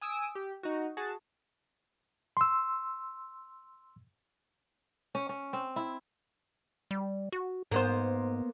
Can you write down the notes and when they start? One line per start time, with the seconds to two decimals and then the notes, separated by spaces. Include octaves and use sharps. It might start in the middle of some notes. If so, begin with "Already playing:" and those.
0.01 G#5 D#6 E6 D7
0.35 G4
0.63 D#4 F#4
0.97 F#4 G#4 A5
2.37 C6 E6
5.15 C#4
5.29 C#4
5.53 C4
5.76 E4
6.91 G3
7.32 F#4
7.71 G#2 A#3 B3 C5